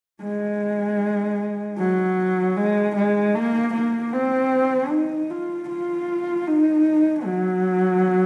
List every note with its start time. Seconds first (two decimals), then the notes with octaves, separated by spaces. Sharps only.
0.22 G#3
1.79 F#3
2.57 G#3
2.96 G#3
3.35 A#3
3.74 A#3
4.13 C4
4.91 D#4
5.30 F4
5.69 F4
6.48 D#4
7.26 F#3